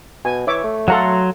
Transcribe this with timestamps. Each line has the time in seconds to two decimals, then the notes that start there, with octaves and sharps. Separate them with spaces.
0.25 B2 G#5
0.47 E3 C#5 E5 D6
0.64 A3
0.88 F#3 A4 F5 F#5 A#5 C6